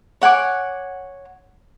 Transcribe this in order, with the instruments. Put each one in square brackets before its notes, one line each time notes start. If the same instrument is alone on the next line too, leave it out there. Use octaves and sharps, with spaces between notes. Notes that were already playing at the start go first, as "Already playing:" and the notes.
[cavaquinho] C#5 F#5 G#5 D6